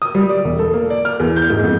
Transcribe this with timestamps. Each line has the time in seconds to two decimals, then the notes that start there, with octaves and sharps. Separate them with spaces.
0.02 D#6
0.15 G3
0.29 D5
0.44 E1
0.59 A4
0.74 A#3
0.90 D5
1.05 F6
1.20 E2
1.36 G6
1.50 G#2
1.64 F2